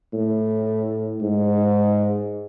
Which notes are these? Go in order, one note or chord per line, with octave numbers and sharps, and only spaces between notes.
A2
G#2